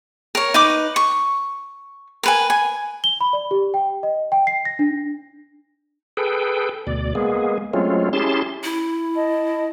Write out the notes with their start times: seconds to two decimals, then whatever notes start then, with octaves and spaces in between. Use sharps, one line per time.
0.35 A#4 C#5
0.54 D#4 B4 D6
0.96 C#6
2.23 A#4 B4 G#5
2.50 G#5
3.04 G7
3.21 B5
3.33 D5
3.51 G4
3.74 G5
4.03 D#5
4.32 G5
4.47 C7
4.65 A#6
4.79 D4
6.17 G#4 A4 B4 G5
6.87 D2 B2 D5
7.15 G#3 A#3 B3 G#4
7.73 F#3 G#3 A3 C4 C#4 F4
8.13 C#4 E4 G4 G#4 A5 C6
8.64 E4
9.15 D#5 A5